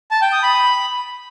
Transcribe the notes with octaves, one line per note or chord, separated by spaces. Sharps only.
A5
G5
D#6
B5